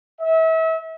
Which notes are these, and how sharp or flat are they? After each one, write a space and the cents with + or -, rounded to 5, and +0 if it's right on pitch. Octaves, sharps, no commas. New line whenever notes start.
E5 -35